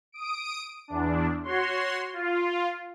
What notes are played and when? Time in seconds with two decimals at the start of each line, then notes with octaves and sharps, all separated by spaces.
0.12 D#6 D7
0.88 E2 D4
1.43 F#4 C#5 C6
2.13 F4